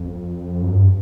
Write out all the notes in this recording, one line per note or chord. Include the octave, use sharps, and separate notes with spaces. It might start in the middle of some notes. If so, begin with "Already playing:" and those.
Already playing: F2
F#2
G2